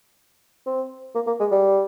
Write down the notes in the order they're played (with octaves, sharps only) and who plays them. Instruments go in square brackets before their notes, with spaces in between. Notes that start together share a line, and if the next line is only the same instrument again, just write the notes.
[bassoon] C4
A#3
A#3
G#3
G3